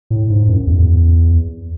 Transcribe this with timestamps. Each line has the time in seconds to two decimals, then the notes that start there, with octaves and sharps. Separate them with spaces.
0.10 A2
0.30 G#2
0.48 F#2
0.67 E2